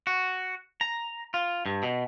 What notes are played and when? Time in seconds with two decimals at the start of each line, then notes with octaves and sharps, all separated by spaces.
0.07 F#4
0.81 A#5
1.34 F4
1.66 G2
1.83 B2